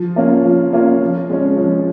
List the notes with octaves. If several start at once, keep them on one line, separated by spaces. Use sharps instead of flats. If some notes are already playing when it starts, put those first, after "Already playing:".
Already playing: F3
A#3 C#4 F4
F3
A#3 C#4 F4
F3
G#3 C#4
F3